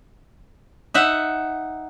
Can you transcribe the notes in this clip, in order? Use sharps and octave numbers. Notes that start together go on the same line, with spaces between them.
D#4 E5 F#5